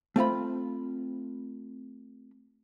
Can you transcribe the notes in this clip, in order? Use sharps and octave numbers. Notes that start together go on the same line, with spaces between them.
A3 C4 F4 B5